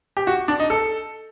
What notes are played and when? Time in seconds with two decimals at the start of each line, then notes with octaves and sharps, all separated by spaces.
0.17 G4
0.27 F#4
0.48 D4
0.60 D#4
0.70 A4